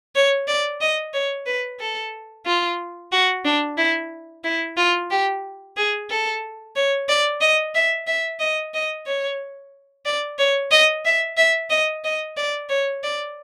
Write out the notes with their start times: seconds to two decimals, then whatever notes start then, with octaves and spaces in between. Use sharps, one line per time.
0.15 C#5
0.48 D5
0.81 D#5
1.14 C#5
1.46 B4
1.80 A4
2.46 F4
3.12 F#4
3.45 D4
3.78 E4
4.44 E4
4.77 F4
5.11 G4
5.77 G#4
6.10 A4
6.76 C#5
7.09 D5
7.41 D#5
7.75 E5
8.07 E5
8.40 D#5
8.74 D#5
9.07 C#5
10.06 D5
10.38 C#5
10.71 D#5
11.05 E5
11.37 E5
11.70 D#5
12.04 D#5
12.37 D5
12.69 C#5
13.04 D5